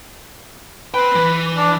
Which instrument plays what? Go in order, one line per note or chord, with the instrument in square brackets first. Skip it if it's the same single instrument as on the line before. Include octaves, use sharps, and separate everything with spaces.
[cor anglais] B4 [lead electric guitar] C5 G5
[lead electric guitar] E3
[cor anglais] D4